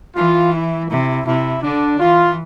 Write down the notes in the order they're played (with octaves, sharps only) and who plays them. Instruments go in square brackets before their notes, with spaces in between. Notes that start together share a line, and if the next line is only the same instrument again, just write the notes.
[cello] E3 [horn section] F4
[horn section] E4
[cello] C3 [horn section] E4
[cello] C3 [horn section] E4
[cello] D3 [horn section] D4
[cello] E3 [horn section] F4